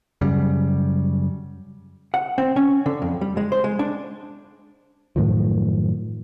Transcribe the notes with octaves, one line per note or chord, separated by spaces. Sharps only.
F#2 C#3 G3
F#5
C4
C#4
D3
F2
G3
G#3
C5
G#3
D4
F#2 A2 D#3 F3